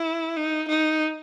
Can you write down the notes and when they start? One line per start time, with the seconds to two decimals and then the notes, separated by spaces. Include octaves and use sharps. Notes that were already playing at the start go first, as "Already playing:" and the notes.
Already playing: E4
0.37 D#4
0.68 D#4